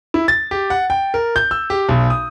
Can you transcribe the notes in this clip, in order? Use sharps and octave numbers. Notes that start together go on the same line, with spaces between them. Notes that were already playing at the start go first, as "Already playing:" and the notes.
E4
A6
G4
F#5
G5
A#4
G6
E6
G4
B1
D#6